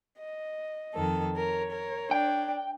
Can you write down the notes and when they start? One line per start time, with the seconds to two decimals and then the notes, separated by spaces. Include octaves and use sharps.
0.19 D#5
0.94 F2 D#3 A4
1.36 A#4 C#5
1.72 A#4
2.11 D4 G5